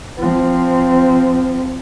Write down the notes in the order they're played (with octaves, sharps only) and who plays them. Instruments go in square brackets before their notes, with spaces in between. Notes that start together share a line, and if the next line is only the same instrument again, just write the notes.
[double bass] F3 C4